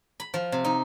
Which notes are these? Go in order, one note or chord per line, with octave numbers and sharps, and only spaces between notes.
B5
F3
C3
D#4